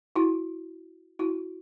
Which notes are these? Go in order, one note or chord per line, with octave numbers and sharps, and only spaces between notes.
E4 F#4
E4 F#4